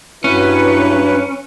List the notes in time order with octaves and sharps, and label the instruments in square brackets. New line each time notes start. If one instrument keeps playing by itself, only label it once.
[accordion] G2 F#3 B4 [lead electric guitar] C#4 [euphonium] E4